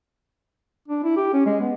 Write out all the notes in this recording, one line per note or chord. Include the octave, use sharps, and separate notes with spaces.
D4
E4
G4
C#4
G#3
B3